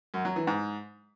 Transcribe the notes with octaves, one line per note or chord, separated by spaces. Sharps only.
F#2
F#3
E3
G#2